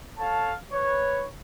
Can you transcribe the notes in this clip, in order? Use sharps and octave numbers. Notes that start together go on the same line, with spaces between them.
A4 C#5 F5 A5
B4 C#5